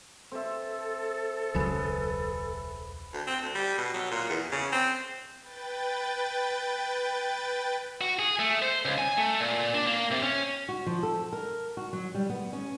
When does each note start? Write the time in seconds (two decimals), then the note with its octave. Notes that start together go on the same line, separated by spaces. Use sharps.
0.32 C4 A4 E5
1.54 E1 C#2 F#3 G#4 B4
3.13 D2
3.27 C4
3.42 D2
3.55 G3
3.78 B2
3.94 F#3
4.11 A#2
4.29 E2
4.52 C#3
4.72 C4
5.37 B4 G5 A6
8.01 F#4
8.19 G#4
8.39 A3
8.62 C5
8.85 C#2
8.98 G#5
9.17 A3
9.40 A#2
9.74 D4
9.87 A#3
10.11 C3
10.23 C#4
10.69 F#4
10.86 F3
11.03 A4
11.33 A#4
11.77 F#4
11.93 F#3
12.15 G3
12.30 B3
12.53 C#4